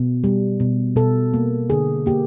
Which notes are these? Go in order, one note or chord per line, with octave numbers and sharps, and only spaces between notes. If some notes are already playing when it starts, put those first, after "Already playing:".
Already playing: B2
G3
B2
B2 A4
A#3
D3 G#4
A#3 G4